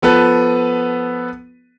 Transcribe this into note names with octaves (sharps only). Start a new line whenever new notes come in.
F3 B3 A4 B4